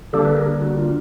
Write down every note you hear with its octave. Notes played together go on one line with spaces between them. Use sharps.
D3 G3 A#3 D4 G4 A4
A4 B4
G#4 A#4
F#4
F4